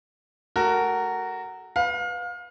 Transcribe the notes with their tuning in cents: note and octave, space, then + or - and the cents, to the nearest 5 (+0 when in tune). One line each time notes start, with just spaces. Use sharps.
A3 -20 F#4 +15 A#4 -15
B4 +0 F5 +30